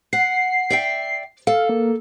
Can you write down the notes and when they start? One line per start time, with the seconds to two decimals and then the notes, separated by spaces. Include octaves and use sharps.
0.13 F#5 C7
0.70 D5 E5 G5
1.47 A4 F5
1.69 A#3